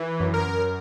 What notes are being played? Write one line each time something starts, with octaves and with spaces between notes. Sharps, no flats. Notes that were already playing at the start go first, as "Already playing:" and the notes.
Already playing: E3
F#2
A#4
F#2